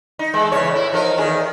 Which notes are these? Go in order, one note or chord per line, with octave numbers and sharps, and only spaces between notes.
D#4
E3 G#3
E2 C#3 C#5
A2 E4
F3 D#4 A#4
E2 D#3 G#4